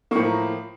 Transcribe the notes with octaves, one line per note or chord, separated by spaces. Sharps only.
A2 F3 A#3 C#6
A#5